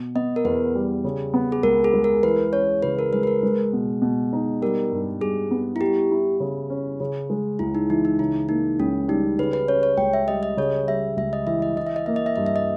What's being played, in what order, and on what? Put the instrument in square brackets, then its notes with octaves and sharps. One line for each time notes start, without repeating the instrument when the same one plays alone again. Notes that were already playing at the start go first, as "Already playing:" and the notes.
Already playing: [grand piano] B2
[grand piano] B3 [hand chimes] D#5
[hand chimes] A#4
[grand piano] E2 [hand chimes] B4
[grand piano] G3
C#3
B3
[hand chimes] G#4
[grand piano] C#2 [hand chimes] A#4
[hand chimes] G#4
[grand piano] G#3
[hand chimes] A#4
[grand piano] E3 [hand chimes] B4
[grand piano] C#4 [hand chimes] C#5
[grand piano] C#3 [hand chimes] B4
[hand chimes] A#4
[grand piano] G#3 [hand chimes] B4
[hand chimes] B4
A#4
[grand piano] G#3
B2
B2
D#4
[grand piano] G3 [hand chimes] A#4
[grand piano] G2
[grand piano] G2 [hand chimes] G#4
[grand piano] B3
[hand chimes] E4
[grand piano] G3 [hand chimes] G4
[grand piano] E4
C#3
C#4
C#3
G#3
[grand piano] C#2 [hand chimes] E4
[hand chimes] D#4
[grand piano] E3 [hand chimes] D#4
[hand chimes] D#4
[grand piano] C#3 [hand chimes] E4
[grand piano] A#3 [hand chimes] D#4
[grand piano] C#2 [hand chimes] C#4
[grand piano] G3 [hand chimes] D#4
[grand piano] C#3 [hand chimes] B4
[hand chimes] B4
[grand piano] C#4 [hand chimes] C#5
[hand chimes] C#5
[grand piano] C#2 [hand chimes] G5
[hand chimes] E5
[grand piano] G3 [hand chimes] D#5
[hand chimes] D#5
[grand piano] C#3 [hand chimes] C#5
[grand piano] G3 [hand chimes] E5
[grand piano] C#2 [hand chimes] E5
[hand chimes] D#5
[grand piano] E3 [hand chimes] E5
[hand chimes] D#5
[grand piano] E3 [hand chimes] D#5
[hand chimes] E5
D#5
[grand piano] A#3 [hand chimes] E5
[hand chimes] D#5
E5
[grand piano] G2 [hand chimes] D#5
[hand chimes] E5
D#5